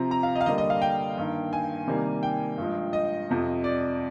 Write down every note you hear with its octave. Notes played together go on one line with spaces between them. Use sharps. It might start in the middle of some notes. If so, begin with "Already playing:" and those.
Already playing: C3 F3 C4 A#5
A#5
F5
D#5
F5
D3 G3 A#3 D#5
D#5
F5
G5
G2 D#3 A#3
G#5
C3 D#3 G3 A#3
G5
G2 F3 G#3
D#5
F2 C3 F3
D5